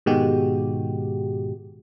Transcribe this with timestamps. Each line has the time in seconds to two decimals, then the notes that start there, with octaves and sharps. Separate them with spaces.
0.06 G#2 B2 D#3 G#3 F#4 G4